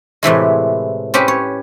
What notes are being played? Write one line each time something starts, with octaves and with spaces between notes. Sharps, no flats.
A2 C3 E3 G#3
C4 C#4 G4 B4
C#5